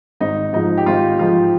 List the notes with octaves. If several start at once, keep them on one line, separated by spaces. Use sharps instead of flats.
G#1 D#4
G#2 F3 D#4
G4
G#1 F4
G#2 F3 F4